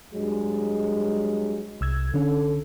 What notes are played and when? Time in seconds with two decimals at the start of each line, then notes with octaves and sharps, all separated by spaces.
0.15 G2 F#3 G#3
1.81 C2 E6 G#6
2.14 D3 C#4 A4